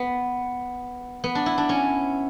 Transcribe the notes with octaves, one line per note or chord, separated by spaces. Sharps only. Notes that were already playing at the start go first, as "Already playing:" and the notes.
Already playing: B3
B3
D4
E4
D4
C#4